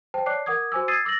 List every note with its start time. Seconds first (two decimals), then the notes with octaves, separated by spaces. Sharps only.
0.14 C5 G5 A5
0.26 C#5 D5 A5 D6 F#6 C7
0.46 A#4 F#5 D6 D#6 G#6
0.72 F#4 C5 G#5 D6 E6
0.88 D#6 E6 G#6 A6 C7 D#7
1.05 D6 E6 A6 A#6 F#7